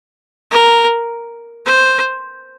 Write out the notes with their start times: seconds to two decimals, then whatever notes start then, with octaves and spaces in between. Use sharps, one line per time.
0.51 A#4
1.66 C5